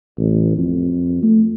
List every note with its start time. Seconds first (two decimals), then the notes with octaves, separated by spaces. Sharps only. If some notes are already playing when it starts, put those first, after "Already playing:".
0.18 A1
0.58 F2
1.23 A3